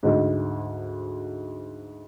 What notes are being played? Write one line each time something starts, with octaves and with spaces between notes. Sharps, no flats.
D2 G#2